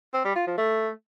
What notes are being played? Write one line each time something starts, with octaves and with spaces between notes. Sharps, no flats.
C4
G3
F4
F3
A3